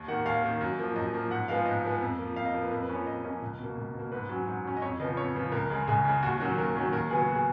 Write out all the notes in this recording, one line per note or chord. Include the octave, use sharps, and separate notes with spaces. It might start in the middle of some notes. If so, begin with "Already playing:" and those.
Already playing: D#2
D#3 A#3 F#5
D#2 F5
D#3 A#3
F#2
F3 A#3
F#2 D#5
F3 A#3
G#2 F#5
F3 G#3 B3 F5
G#2 D#5
F3 G#3 B3
F2
F3 A#3
F2 F5
D#5
F3 A#3
B4
F2 A#4
B4
F3 A#3 C#4
C#5
F2 D#5
F3 A#3 C#4 D#5
C#2
B2 A#3
C#2
B2 A#3
G#2 B4
F#3 C#4
G#2
F#3 C#4
D#5
F2 C#5
C#3 F3 B3 D#5
F2 C#5
C#3 F3 B3
C#2 A#4
C#3 G#3
C#2 G#4
C#3 G#3
D#2 F#4
D#3 F#3 A#3 C#4 F#4
D#2 A#4
D#3 F#3 A#3 C#4
D#2 A#4
C#3 F#3 B3 G#4
F#4
G#4